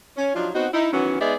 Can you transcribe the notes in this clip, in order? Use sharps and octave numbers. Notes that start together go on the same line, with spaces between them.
C#4
F3 F#3 D4 D#4 F4
B3 C4 D#4 F#4
D#4 E4
D#3 E3 F#3 B3 C#4
G#3 B3 D#4 G#4 D5 E5